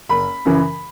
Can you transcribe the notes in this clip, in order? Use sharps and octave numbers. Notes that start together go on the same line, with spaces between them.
F#1 B5
F#2 C#3 E3